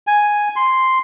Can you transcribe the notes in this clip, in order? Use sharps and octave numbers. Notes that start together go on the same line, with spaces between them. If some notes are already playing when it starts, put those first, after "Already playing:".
G#5
C6